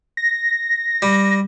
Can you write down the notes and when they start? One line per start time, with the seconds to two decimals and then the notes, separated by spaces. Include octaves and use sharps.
0.17 A#6
1.02 G3